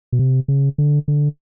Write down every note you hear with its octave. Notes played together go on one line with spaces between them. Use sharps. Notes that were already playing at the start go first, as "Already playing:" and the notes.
B2
C3
C#3
D3
D3